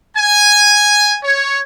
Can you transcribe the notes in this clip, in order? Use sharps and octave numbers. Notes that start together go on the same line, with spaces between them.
G#5
C#5